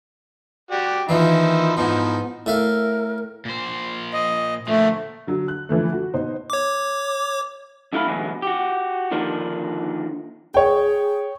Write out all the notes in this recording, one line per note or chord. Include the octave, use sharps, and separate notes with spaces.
F#4 G4 D5
D#2 A#2 E3 F3 D#4 E4
G#2 B2 E3 F3 D#4
A2 A#4 E5 F5
A#2 C5
D#5
A#2 D3 F3 A3
D3 F#3
F#6
D3 E3 F3 A3
F#4
B2 D#4 C5
C#5 D6
F#2 A2 E4 A4 F5 B5
D2 B2 E3 F#3 G#3
F#4 G4
D3 D#3 F3 A#3 D4 D#4
G#4 C#5 G5